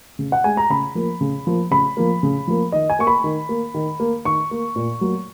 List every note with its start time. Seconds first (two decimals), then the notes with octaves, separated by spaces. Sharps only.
0.19 C#3
0.32 F#5
0.44 G#3 G#5
0.57 A#5
0.70 C#3 B5
0.95 F3 A#3
1.21 C#3
1.47 F3 A#3
1.71 C#3 B5
1.97 F3 A#3
2.23 C#3
2.48 F3 A#3
2.72 D#3 D#5
2.90 G#5
2.99 A#3 C#6
3.07 B5
3.24 D#3
3.49 A#3
3.74 D#3
4.00 A#3
4.25 D#3 C#6
4.51 A#3
4.76 A#2
5.01 F#3 A#3